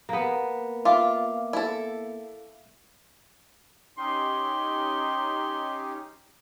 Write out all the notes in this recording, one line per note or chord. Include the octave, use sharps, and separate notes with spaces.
A#3 B3
F4 E5 F5 D6
E4 A4
C#4 D#4 G4 C6